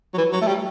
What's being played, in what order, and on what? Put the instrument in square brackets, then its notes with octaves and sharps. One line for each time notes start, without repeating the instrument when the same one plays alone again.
[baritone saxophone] F#3
E3
F#3
A3
G3